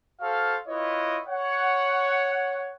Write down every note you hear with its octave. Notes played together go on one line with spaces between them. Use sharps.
F#4 A4 C5 F5
E4 F4 B4 C#5 D#5
C#5 F#5